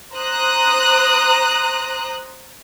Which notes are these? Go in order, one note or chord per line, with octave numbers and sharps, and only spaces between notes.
C5 A#5 D#6 F#6